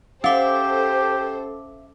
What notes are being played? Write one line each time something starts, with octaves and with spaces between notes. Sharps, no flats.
C#4 G4 A4 C5 E5 F5 D6